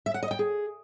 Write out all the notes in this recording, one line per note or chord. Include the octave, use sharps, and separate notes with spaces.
E5
F#5
D#5
G5
G#4